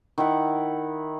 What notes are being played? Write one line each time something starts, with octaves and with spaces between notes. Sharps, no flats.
D#3 E4 F#5